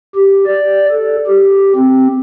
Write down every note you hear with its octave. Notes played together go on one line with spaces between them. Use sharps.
G4
D5
A4
G4
C4